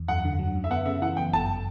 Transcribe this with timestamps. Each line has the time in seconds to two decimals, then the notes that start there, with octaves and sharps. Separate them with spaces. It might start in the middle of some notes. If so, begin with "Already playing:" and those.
Already playing: E2
0.08 F#2 F#5
0.25 D3
0.39 F#3
0.55 F#2
0.64 E5
0.71 B3 F#5
0.86 C#3 E5
1.02 E3 F#5
1.17 F#2 G5
1.33 G1 A5